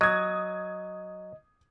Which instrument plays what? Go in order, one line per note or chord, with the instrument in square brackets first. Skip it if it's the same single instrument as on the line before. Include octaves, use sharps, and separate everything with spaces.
[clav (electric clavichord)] F#3 [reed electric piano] D#5 [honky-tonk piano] D#6 G#6